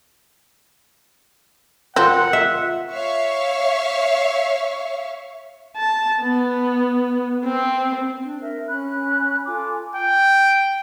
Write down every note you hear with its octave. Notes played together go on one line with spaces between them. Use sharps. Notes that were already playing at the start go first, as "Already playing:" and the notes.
C4 F4 A#4 F#5 F#6
E5
C#5 E5 F5 C#6
A5
B3
C4
D4
A#4 E5
C#4 B5 F#6
F4 A4 G#5 D6
G5